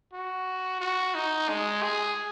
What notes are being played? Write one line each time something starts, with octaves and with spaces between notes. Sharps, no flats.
F#4
F#4
D#4
G#3
G#4